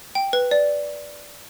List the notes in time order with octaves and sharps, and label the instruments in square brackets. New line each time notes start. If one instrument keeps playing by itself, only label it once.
[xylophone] G5
B4
D5